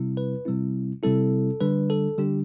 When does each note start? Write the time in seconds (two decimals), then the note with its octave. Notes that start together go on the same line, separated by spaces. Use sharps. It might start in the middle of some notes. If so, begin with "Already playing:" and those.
Already playing: C3 G3 C4 E4
0.17 B4
0.45 C3 G3 C4 E4
1.03 C3 G3 C4 E4 A4
1.61 D3 G3 D4 B4
1.90 A4
2.18 D3 G3 D4 G4